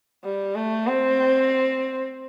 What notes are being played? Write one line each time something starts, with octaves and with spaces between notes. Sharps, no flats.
G3
A3
C4